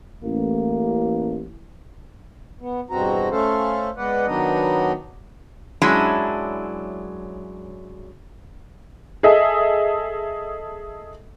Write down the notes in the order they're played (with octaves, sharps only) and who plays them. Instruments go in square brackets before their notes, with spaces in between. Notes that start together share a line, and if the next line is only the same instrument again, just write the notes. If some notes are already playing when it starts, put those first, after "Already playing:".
[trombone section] A1 [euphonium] A#3
[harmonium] B3
E2 G2 B2 C4 F#4 A#5
A3 C#4 A4 C5 F5
G#3 B3 B4 D5 F#5
D#3 F#3 B3 D4 D#4 D#5
[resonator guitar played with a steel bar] F#2 F#3 G#3 D4 E4
[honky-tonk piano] G#4 A4 D#5 E5